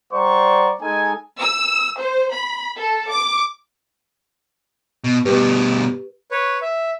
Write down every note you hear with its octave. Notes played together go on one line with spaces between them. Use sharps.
G3 C5 D5 F#5 A#5 C#6
G#3 D#4 A4 G#5
E6
C5
B5
A4
D6
B2
G2 B2 G4 B4
B4 C#5
E5